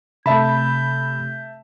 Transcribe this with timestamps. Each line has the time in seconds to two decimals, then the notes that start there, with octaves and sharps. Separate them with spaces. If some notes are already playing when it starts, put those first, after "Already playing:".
0.26 C3 A3 E5 A5 B5 G6